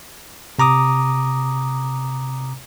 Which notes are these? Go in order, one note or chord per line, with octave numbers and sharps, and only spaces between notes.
C3 A#5 D6 D#6